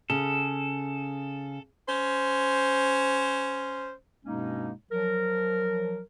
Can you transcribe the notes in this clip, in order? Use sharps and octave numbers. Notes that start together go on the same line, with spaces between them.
C#3 A4
C#4 C5
G2 B2 G#3 A#3 C#4 D#4
F3 F#3 A#4